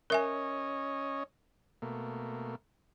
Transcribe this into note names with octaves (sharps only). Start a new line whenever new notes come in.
C#4 A#4 C#5 D#5 E5 G#5
B2 A3 A#3